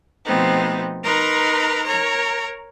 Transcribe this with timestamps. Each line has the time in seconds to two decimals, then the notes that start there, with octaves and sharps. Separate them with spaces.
0.24 B2 F3 A3 B3 C4 D#4
1.04 D#4 A#4 B4 A#5 C6
1.84 A#4 C#5 A#5